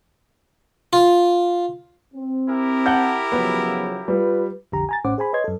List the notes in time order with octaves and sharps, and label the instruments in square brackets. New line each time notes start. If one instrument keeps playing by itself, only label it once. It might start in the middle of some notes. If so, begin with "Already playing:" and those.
[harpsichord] F4
[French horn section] C4
[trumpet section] E4 G4 A#4
[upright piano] F#5 A5 G6
[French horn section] C#3 F3 F#3 [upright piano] B3
[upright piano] G3 [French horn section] F4 B4
[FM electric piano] B1 F2 D3 G4 A#5
G#5 A#5 A6
A1 A2 C#4 C5 F#5 D6
G#4 C5 G#5 B5
B4 C#5 D#5 C6 G#6
F#2 A4